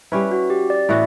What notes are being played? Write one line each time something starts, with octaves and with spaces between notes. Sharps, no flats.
G3 C#4 E4 B4
F#4
G4
D5
A2 E3 B3 F#4 E5